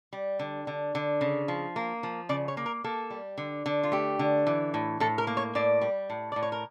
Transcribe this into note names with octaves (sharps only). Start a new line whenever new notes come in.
G3
D3
D3
D3
C#3
F3
A#3
F3
C#3 D5
C#5
A#3
A#4
A#3 A4
G3
D3
D3
F4
A3 G4
D3
E3
A2
A2 A4
A#4
A#3
C#5
A2 D5
G3
A2
A2 D5
C#5
A#4